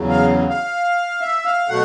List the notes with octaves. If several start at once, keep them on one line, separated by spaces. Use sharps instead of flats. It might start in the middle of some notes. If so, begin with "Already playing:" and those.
Already playing: E2 C#3 F#3
F5
F5
E5
F5
B2 F#3 A3 F#5